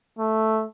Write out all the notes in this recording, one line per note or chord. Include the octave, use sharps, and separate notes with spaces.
A3